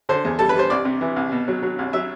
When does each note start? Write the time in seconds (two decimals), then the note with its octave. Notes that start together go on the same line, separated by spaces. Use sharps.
0.09 D3 C5
0.25 E2
0.39 G3 A4
0.49 B4
0.55 G3 C5
0.70 C2 D5
0.85 C3
1.01 E3
1.16 C2
1.32 B2
1.48 F#3
1.62 F#3
1.79 C2
1.93 F#3 E5